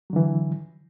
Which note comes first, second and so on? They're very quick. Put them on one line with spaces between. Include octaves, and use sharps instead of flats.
F#3 D3 E3